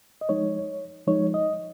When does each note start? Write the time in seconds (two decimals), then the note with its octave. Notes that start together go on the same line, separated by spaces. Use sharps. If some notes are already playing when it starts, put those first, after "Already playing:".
0.21 D#5
0.29 F3 G#3 D#4 C#5
1.07 F3 G#3 D#4 C#5
1.34 D#5